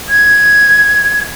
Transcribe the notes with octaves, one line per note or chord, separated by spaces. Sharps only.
G#6